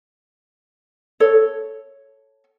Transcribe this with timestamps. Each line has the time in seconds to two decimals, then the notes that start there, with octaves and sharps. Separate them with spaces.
1.20 A4 C#5